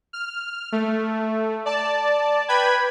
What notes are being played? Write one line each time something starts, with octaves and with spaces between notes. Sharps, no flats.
F6
A3
D5 A5
B4 G5 B5 G#6